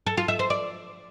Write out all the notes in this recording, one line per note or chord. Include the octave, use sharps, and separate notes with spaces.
A4
F4
E5
C5
D5